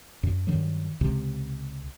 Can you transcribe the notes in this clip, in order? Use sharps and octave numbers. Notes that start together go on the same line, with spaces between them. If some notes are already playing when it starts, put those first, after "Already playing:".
F#2
G2 D#3 F#3
C#2 C3